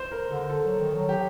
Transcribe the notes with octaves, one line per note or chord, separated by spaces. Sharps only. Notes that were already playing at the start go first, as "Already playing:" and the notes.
Already playing: C5
A#4
D3 A4
A4
F#3
D#3
F#3
G4